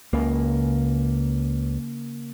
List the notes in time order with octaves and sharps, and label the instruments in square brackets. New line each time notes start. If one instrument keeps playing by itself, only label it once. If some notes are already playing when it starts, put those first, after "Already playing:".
[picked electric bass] C#2 [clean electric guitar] C#3 A#3